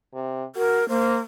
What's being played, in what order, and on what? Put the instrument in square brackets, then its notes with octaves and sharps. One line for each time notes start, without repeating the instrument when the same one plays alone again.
[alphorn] C3
[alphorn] F#4 [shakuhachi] A#4
[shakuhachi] A#3 [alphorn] C5